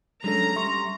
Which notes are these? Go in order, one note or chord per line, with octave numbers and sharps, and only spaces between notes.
F#3 G#3 A3 C#4 D4 A4 A#5
G3 E5 C6 C#6